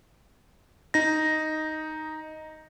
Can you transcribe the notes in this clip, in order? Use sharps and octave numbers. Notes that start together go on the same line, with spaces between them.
D#4 A#6